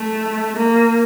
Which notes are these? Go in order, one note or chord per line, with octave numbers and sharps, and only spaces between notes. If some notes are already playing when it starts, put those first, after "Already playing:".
Already playing: A3
A#3